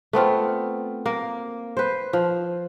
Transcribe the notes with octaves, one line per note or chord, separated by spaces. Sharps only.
A3 B3 C4 F4
A#3
B4 C5
F3